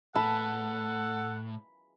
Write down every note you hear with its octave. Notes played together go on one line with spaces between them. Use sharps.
A2 A4 F#5 A5 B5